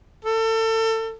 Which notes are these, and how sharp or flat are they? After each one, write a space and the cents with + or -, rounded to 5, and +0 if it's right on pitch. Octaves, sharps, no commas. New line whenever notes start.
A4 +30